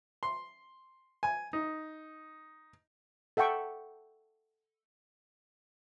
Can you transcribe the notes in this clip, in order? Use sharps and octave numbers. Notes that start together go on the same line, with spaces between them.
C6
G#5
D#4
A4 E5 F#5 G5 C#6